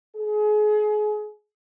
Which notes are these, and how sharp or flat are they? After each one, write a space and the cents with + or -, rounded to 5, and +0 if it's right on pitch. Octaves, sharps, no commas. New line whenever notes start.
G#4 +30